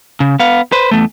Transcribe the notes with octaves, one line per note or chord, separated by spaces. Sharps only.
C#3
B3 F5
B4 C5
E2 A3